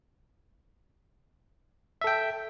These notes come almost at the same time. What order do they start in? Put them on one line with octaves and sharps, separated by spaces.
E5 A4 G5